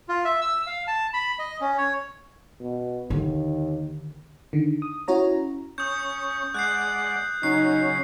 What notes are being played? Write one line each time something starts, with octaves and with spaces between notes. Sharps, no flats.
F4
E5
E6
F5
A5
B5
D#5
C#4
C#5
B2
D#2 D3 D#3
D3 D#3
D#6
C#4 E4 F#4 C#5 A#5
C#4 C#6 D#6 G6
G#3 D5 F#5 F#6 G6 C7
C#3 F#3 C#4 D#4 C7